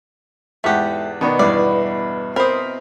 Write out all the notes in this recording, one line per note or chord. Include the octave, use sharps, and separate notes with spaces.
E2 G#2 A3 G4 F#5
B2 D#3 B3 D4 C#6
E2 G2 E4 D5
C4 A#4 C5 D#5 B5